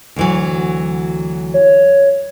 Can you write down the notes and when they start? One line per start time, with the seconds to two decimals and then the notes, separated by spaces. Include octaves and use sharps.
0.16 D2 E3 F#3
1.54 C#5